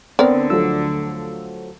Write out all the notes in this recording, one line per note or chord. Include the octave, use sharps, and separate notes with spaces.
D2 D3 B3 C4 A#4 D5
F3 F#3 A3 E6